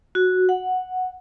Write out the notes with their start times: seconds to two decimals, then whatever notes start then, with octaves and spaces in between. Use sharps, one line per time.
0.15 F#4
0.49 F#5